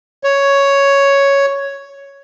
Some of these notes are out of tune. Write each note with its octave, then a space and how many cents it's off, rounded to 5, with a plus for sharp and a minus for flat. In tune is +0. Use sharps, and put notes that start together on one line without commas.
C#5 +5